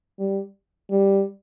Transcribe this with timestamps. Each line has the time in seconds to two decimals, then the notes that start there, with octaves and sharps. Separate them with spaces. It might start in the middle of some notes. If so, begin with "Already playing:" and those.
0.19 G3
0.91 G3